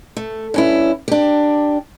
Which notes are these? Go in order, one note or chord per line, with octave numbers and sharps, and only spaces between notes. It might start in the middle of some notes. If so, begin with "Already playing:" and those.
A3
G2 C#4 E4
D4 G4